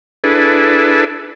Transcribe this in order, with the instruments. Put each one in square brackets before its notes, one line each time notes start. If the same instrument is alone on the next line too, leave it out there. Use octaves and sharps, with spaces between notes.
[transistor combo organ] D4 E4 G#4 A4 B4